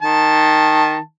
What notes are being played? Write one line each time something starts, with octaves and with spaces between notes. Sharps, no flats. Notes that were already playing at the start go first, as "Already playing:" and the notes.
D#3 A5